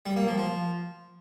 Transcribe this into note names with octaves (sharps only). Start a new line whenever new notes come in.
G3
A#3
F3
F3